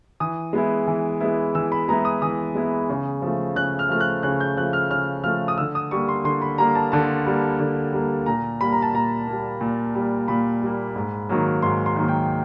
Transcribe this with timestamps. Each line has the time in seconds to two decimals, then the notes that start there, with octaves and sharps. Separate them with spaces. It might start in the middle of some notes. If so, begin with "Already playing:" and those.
0.20 E3 D#6
0.53 G#3 B3 E4
0.87 E3
1.20 G#3 B3 E4
1.55 E3 E6
1.72 B5
1.89 G#3 B3 E4 A#5
2.05 D#6
2.22 E3 D#6
2.55 G#3 B3 E4
2.90 C#3
3.22 F3 A3
3.56 C#3 F#6
3.79 F6
3.89 F3 A3 F6
4.00 F#6
4.23 C#3 F#6
4.40 G6
4.57 F3 A3 F#6
4.73 F6
4.90 C#3 F6
5.24 F3 A3 F6
5.48 D#6
5.58 D3 E6
5.75 D#6
5.91 G3 A#3 C#6
6.09 C6
6.24 D3 C6
6.42 B5
6.58 G3 A#3 A#5
6.75 A5
6.92 D3 A5
7.26 G3 A#3
7.60 D3
7.93 G3 A#3
8.26 A#2 A#5
8.61 G3 A#3 B5
8.72 A#5
8.82 A5
8.93 A#2 A#5
9.27 G3 A#3
9.61 A#2
9.95 G3 A#3
10.28 A#2 B5
10.62 G3 A#3
10.96 G#2
11.29 D#3 F#3 A#3
11.62 G#2 C6
11.86 C6
11.96 D#3 F#3 A#3
12.08 G5